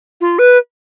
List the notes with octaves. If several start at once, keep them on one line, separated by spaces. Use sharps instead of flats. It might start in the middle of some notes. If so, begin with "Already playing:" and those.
F4
B4